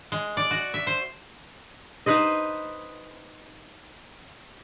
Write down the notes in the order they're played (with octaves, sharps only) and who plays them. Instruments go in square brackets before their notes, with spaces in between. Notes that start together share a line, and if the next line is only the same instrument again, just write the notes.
[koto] G#3
D5
F#4
E5
C5
[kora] D#4 B4 C5 D#5